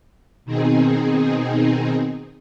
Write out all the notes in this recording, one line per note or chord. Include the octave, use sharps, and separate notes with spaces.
B2 D#3 C4 D#4 G#4